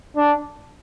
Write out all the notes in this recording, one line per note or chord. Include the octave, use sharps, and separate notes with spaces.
D4